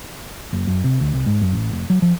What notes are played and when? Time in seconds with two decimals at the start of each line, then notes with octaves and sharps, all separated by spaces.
0.53 F#1
0.67 F#2
0.84 C3
1.01 D2
1.13 C2
1.26 G#2
1.42 F#2
1.53 A1
1.71 F1
1.90 F#3
2.02 F3